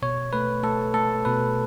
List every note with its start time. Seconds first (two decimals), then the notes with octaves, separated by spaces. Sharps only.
0.02 B2 C#5
0.33 A3 B4
0.63 A3 A4
0.94 A3 A4
1.25 B2 B4